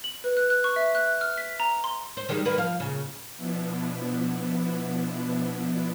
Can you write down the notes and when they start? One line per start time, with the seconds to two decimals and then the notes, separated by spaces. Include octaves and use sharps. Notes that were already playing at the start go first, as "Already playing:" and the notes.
0.04 F#7
0.24 B4
0.37 F#6
0.50 F#6
0.64 C#6
0.76 E5
0.95 F#6
1.21 F6
1.38 B6
1.60 A#5
1.84 C6
2.17 C5
2.29 D#3 G3 G#3
2.45 D#3 A#3 B4
2.58 F3 F5
2.80 A#2 C#3
3.37 B2 F3 B3 D4 E4